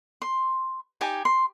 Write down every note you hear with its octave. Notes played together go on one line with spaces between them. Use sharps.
C6
D#4 G4 G#5 A5
C6